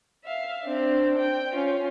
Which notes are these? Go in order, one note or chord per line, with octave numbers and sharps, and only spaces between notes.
E5 F5
C4 D4
G5
C#4 F4